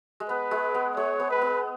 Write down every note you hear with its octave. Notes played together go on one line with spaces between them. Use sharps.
G#3
B3 B4
G#3
B3
G#3 C#5
B3
B4
B3